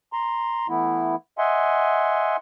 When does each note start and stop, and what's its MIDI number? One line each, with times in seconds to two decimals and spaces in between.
0.13 0.67 82
0.13 0.67 84
0.69 1.16 52
0.69 1.16 57
0.69 1.16 59
0.69 1.16 64
1.38 2.37 75
1.38 2.37 76
1.38 2.37 78
1.38 2.37 80
1.38 2.37 84